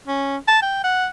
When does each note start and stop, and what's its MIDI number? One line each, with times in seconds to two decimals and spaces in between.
0.08 0.37 61
0.48 0.61 81
0.62 0.80 79
0.84 1.07 78